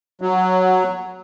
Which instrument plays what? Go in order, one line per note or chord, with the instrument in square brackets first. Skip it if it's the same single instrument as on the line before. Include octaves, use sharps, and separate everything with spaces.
[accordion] F#3